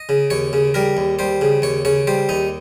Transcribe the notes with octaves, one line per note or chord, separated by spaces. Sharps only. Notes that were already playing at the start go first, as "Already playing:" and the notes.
Already playing: D#5
C#3
D#2 C#5
C#3
G3 A#4
D#2
G3 C5
C#3
D#2 C#5
C#3 C#5
G3 C5
D#2 D#4